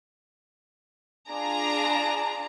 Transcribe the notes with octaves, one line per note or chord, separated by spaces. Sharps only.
D4 F4 G#4 A#5